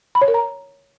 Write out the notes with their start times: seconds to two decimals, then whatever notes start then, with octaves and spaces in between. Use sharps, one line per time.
0.15 B5
0.22 C#5
0.28 A#4
0.34 A#5